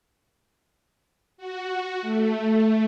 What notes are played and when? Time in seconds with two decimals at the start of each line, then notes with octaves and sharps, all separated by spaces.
1.37 F#4
2.02 A3